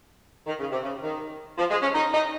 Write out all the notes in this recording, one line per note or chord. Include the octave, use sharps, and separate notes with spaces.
D#3
C#3
C3
C#3
D#3
F3
G#3
C#4
D#4
D#4